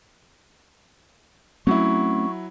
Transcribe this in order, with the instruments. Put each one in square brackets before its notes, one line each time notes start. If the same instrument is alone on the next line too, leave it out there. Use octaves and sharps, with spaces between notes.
[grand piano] F#3 E4 [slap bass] A3 C4 C#4 [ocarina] C#6